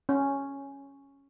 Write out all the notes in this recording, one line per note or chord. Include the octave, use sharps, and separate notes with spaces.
C#4